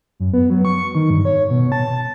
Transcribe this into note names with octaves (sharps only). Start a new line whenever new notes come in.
F#2
B3
F#3
C#6
D#3
G2
C#5
B2
A5